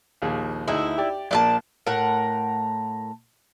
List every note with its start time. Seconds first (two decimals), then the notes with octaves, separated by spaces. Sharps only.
0.22 A#1 D#2 G#4
0.68 D2 D#4 E4 G#4
0.98 G4 D5
1.31 A#1 A#3 D5 D#5 A5
1.87 A2 A#4 F#5